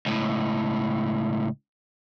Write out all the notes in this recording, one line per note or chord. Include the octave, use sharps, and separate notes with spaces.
C#2 A2